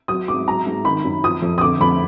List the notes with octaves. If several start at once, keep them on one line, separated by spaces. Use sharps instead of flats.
F#3 D#6
G#2 D6
F#3 A#5
G#2
D#3 B5
F#2
F3 D#6
F2
D#6
D3 D6
F2 B5